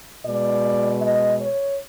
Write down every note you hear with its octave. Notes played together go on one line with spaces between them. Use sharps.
B2 G#3 D5
D#5
C#5